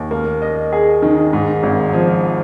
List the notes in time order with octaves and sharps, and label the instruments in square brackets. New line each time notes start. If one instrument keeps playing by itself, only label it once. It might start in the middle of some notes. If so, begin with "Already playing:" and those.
Already playing: [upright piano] D#2
A#3
D#5
G#4
D#3
G#2
G#1
F3